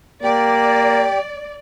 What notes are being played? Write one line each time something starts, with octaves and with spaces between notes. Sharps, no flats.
A#3 G4 D5